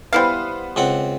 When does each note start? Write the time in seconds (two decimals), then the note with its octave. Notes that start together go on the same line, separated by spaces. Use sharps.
0.13 G3 B3 E4 B4 C5 F5
0.76 C#2 C4 F#5